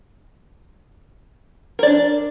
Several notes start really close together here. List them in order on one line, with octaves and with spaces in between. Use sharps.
A#4 D5 D4